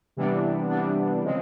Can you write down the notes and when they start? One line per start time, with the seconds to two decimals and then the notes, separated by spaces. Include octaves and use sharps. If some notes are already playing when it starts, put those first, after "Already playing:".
0.17 C3 E3 G3 B3 D4
0.69 C3 E3 G3 B3 D4
1.21 C#3 F3 G#3 C4